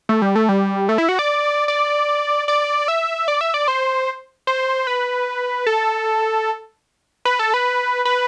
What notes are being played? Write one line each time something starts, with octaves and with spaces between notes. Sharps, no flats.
A3
G3
A3
G3
A3
E4
F#4
D5
D5
D5
E5
D5
E5
D5
C5
C5
B4
A4
B4
A4
B4
B4